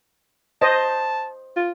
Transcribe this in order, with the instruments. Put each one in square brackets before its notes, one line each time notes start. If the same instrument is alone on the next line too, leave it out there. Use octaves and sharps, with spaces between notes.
[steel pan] C5 D#5 [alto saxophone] A5
[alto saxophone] F4